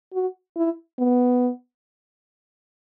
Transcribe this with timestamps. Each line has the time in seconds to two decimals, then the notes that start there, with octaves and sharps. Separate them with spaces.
0.14 F#4
0.57 E4
0.99 B3